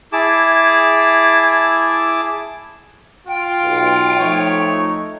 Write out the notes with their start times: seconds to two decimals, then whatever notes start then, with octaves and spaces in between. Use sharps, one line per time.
0.13 E4 G#4 A5 D6
3.27 F4 G5
3.63 B1
4.20 F3 A3 D#4 C#5